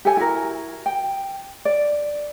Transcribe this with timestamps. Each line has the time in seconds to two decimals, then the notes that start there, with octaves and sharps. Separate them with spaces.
0.05 G4 A4 G#5
0.17 E4 F#4 A#4
0.86 G5
1.65 D5